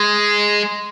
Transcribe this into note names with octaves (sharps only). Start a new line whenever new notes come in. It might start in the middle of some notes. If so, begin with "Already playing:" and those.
Already playing: G#3